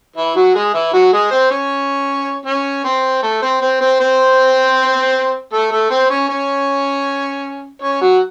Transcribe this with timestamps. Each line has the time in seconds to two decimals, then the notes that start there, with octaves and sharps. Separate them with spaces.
0.16 E3 E4
0.36 F#3 F#4
0.55 G#3 G#4
0.74 E3 E4
0.93 F#3 F#4
1.13 G#3 G#4
1.31 C4 C5
1.50 C#4 C#5
2.46 C#4 C#5
2.84 C4 C5
3.23 A3 A4
3.42 C4 C5
3.61 C4 C5
3.81 C4 C5
4.00 C4 C5
5.53 A3 A4
5.71 A3 A4
5.90 C4 C5
6.10 C#4 C#5
6.29 C#4 C#5
7.82 C#4 C#5
8.01 F#3 F#4